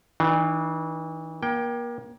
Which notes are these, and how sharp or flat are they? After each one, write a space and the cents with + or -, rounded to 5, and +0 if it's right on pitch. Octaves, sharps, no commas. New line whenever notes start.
E3 -30 D4 +40
A#3 +35 G5 +0